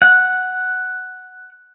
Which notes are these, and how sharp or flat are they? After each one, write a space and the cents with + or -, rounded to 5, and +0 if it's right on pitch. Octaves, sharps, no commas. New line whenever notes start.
F#5 +0